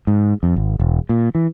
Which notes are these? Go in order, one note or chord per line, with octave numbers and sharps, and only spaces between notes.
G#2
F2
G#1
E1
A#2
E3